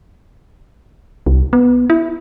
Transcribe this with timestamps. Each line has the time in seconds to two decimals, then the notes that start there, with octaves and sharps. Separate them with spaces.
1.26 C2
1.53 B3
1.90 E4